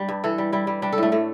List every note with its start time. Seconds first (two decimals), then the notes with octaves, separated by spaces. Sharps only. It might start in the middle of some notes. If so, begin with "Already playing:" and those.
Already playing: G3 D4
0.09 G2
0.24 E3 A4
0.38 G3
0.52 G3 E4
0.67 G3
0.82 G3 D4
0.92 A4
0.98 A2 A3
1.12 A2 A3